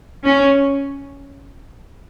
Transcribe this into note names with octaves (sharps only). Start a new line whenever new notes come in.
C#4